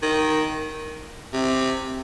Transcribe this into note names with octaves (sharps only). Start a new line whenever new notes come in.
D#3
C3